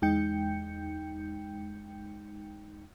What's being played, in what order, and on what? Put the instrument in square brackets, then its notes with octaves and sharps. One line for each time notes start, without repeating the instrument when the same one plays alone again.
[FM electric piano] E2 G#3 D#4 G5 G6 C#7